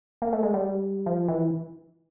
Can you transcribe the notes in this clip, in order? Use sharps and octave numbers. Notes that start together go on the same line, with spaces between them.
A#3
A3
G#3
G3
F3
E3